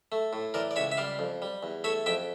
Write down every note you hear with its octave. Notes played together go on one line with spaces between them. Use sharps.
A3
A2
E3 A#4 D5
D5
C#2 C#5 E5
E5
G3 D5 F5
F2
G3
E2
A3 C#5 E5
F2 E5 G5